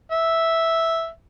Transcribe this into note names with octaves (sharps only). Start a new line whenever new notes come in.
E5